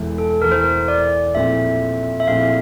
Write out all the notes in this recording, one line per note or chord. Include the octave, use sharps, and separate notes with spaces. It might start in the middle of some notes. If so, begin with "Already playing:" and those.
Already playing: E1 E2 E3 A3 E4
A4
E1 E2 E3 A3 E4 A#4
C5
A#4
D5
A#1 A#2 A3 C4 E4 E5
E5
A#1 A#2 A3 C4 E4 F5